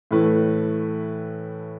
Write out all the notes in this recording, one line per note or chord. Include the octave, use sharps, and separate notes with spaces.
A2 E3 A3 E4 B4